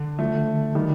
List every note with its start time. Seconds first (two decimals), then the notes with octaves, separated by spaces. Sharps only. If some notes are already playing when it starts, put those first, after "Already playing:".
Already playing: D3
0.19 F3 A3
0.75 D#3 G3